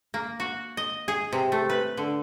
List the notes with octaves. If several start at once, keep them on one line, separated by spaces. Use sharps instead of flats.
A#3
F#4
D#5
G#4
C3
A3
B4
D3